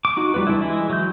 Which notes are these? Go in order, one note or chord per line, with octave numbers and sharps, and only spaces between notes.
D6
D#4 F#4
G3 C4 F4 B4
G3 A3 D4 E4
E3 G#3 E4
F#3 G6